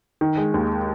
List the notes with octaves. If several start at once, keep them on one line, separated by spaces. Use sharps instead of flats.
D#3
G#3
D#2